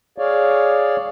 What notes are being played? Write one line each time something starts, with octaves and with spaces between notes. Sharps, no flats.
G#4 C#5 D5 F5